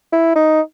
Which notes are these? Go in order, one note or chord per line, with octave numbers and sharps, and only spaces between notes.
E4
D#4